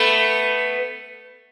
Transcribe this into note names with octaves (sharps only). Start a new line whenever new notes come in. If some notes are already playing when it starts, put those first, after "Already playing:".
Already playing: A3 B3